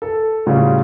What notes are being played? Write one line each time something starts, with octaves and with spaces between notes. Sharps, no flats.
A4
A2 C#3 G3 F4 F#4